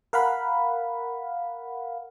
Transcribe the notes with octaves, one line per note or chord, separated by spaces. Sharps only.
A#4 F5 F#5 B5